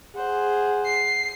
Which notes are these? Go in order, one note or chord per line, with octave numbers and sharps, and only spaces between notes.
G#4 C5 F#5
C7